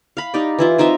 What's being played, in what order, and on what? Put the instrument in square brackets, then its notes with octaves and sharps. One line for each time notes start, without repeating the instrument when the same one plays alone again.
[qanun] F5 B5
D#4 G4 D5
E3 E4 F4
C4 D#4 F4 E5